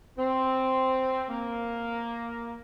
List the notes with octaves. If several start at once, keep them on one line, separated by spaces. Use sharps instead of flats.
C4
A#3